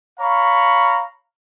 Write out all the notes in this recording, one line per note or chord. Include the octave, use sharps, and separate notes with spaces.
C#5 F5 A#5 B5 C#6